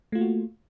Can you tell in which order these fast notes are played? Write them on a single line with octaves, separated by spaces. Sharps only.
A3 F4 A#3 F#4